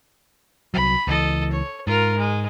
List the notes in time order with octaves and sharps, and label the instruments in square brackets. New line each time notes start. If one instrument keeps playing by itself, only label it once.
[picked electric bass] C2 F#3 [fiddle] B5
[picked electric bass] C#2 E3 [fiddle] A4 D#5
[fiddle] C#5
[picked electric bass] G#2 [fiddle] F4 A#4
[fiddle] G#3